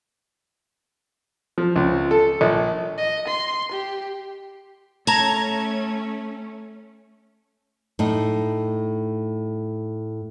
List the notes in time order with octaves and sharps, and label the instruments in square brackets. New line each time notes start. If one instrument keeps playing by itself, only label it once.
[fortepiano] F3
C#2
A4
A#1
[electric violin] D#5
C6
G4
[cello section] A3 C#4 [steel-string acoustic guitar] A5 [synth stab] A#5 G#6
[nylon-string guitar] A2 D#4